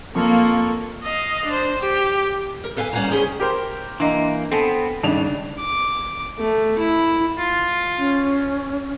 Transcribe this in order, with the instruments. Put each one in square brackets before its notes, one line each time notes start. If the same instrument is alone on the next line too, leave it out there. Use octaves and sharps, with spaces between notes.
[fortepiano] F2 [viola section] A#3 [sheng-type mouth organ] F4 A4 C#6
[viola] D#5 F5
D4 C5
G4
[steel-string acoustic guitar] A#4
A4 B4 F5 G5 G#5
G3 A#3 C#4 F5 F#5 A#5
C#3 C#4 G#4 C5 G5
[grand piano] G4 A#4 C5
[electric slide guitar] E3 A#3 [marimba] D4 D#5 A#5
[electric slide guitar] B3 C4 [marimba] A4 G#5 A5
[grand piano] G#1 D4 F7 [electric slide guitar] G2 C#3
[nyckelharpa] D6
A3
E4
[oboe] F4
[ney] C#4